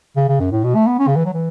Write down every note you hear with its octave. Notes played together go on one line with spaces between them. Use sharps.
C#3
C#3
F#2
A2
B2
A3
B3
C#4
C#3
E3
F#3
E3